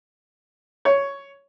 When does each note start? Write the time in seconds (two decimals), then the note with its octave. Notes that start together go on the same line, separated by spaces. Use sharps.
0.85 C#5